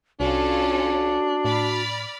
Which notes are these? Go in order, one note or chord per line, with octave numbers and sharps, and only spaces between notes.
C2 C#4 D4 F4 F#4 A4
A2 D5 B5 F6